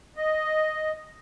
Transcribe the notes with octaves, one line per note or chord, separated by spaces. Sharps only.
D#5